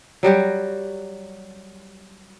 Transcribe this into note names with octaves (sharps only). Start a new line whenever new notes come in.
F#3 G3 F#4 G4